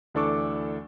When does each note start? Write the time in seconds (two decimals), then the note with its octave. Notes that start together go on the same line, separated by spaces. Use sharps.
0.14 D2 E3 D4 A4 C#6 D6